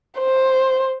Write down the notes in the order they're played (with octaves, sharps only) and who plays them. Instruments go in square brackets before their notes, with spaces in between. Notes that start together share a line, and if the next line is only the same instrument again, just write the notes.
[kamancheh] C5